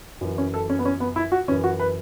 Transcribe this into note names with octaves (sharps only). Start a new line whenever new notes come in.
F#2 E3
C#4
A4
C#4
B3
C#4
B3
E4
F#4
F#2 E3 C#4
F#4
B4